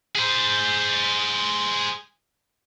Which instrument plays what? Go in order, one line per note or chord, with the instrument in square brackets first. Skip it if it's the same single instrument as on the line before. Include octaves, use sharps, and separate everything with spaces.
[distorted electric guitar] G#4 C5